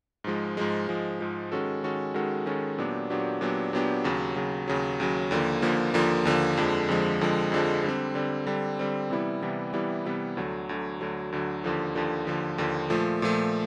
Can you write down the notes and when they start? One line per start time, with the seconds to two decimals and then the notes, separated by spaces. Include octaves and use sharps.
0.24 G#2 F3 G#3
0.57 G#2 F3 G#3
0.88 G#2 F3 G#3
1.19 G#2 F3 G#3
1.52 D#3 G#3 C#4 F#4 A4
1.83 D#3 G#3 C#4 F#4 A4
2.14 D#3 G#3 C#4 F#4 A4
2.46 D#3 G#3 C#4 F#4 A4
2.78 A#2 F#3 B3 D4 G4
3.10 A#2 F#3 B3 D4 G4
3.41 A#2 F#3 B3 D4 G4
3.73 A#2 F#3 B3 D4 G4
4.04 D#2 C#3 F#3
4.36 D#2 C#3 F#3
4.68 D#2 C#3 F#3
5.00 D#2 C#3 F#3
5.31 D#2 D3 F3 A#3
5.62 D#2 D3 F3 A#3
5.94 D#2 D3 F3 A#3
6.25 D#2 D3 F3 A#3
6.57 F2 D3 F3 G#3
6.89 F2 D3 F3 G#3
7.21 F2 D3 F3 G#3
7.52 F2 D3 F3 G#3
7.84 D3 G3 C4
8.15 D3 G3 C4
8.47 D3 G3 C4
8.79 D3 G3 C4
9.10 C3 E3 G3 B3 E4
9.42 C3 E3 G3 B3 E4
9.73 C3 E3 G3 B3 E4
10.05 C3 E3 G3 B3 E4
10.37 D2 D3 F#3
10.69 D2 D3 F#3
11.01 D2 D3 F#3
11.32 D2 D3 F#3
11.64 D#2 D3 F3
11.95 D#2 D3 F3
12.27 D#2 D3 F3
12.58 D#2 D3 F3
12.90 A#2 F3 A3
13.22 A#2 F3 A3